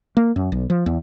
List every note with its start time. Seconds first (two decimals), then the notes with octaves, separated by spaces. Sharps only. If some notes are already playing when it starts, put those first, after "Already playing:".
0.17 A#3
0.36 F#2
0.52 B1
0.70 F3
0.86 E2